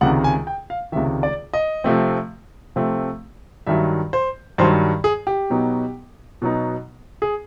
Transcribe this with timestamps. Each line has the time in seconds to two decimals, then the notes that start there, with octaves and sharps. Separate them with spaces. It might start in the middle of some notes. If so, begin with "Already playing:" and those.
0.01 C#2 C3 D#3 F#5
0.24 G#5
0.47 G5
0.70 F5
0.92 C#2 C3 D#3 E5
1.23 D5
1.53 D#5
1.84 C3 F3 A3 C4
2.76 C3 F3 A3 C4
3.67 G2 D#3 F#3 E5
4.13 C5
4.58 G2 D#3 F#3 C5
5.04 G#4
5.27 G4
5.50 B2 F#3 B3 D#4
6.42 B2 F#3 B3 D#4
7.22 G#4